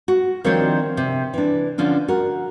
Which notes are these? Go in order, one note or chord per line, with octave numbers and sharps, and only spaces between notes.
F#4
D#3 F3 C4 D4 C#5 D5
C3
E3 D4
D3 F3 C#4 D4
F#4 A#4